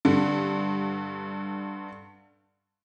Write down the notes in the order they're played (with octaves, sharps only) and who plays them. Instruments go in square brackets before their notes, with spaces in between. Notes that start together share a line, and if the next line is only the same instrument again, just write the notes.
[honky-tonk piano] G2 D3